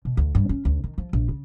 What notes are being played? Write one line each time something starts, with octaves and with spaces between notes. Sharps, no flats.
B2
D2
G2
C#4
D2
D#3
F3
A#1
C#3